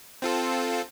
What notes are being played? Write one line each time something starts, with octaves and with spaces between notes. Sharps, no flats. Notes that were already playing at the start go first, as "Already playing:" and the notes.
C4 F4 A4